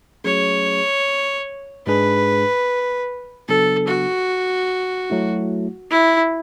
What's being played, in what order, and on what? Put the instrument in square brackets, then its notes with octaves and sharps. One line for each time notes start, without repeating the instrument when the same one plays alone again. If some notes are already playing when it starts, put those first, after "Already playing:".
[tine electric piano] F#3 A3 C#4 G#4 [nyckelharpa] C#5
[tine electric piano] G#2 G#3 D4 G#4 [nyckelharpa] B4
[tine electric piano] C#3 F#3 B3 D4 [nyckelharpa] A4
[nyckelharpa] F#4
[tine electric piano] F#3 A3 E4
[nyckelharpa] E4